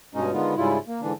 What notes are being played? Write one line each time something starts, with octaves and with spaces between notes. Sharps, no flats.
G2 B2 G#3 C#4 D#4
D3 D#3 G#3 B3 F4
G#2 C#3 G3 E4 F4
A#3
G#2 D3 E3 D4